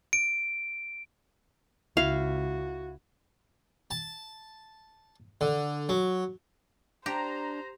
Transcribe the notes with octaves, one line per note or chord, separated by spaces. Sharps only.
D7
C#2 E4 F#4 F5
A5
D3
F#3
D4 G4 C5 A#5